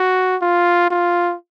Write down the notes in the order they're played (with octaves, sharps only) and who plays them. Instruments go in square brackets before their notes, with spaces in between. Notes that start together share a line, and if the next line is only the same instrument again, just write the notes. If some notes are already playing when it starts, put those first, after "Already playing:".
Already playing: [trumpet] F#4
F4
F4